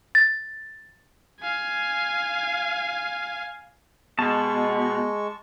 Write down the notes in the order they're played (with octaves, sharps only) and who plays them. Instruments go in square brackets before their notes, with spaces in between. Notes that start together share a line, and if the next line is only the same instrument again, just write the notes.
[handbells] A6
[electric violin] F5 G#5
[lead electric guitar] B2 [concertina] G#3 C#6 [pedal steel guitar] A5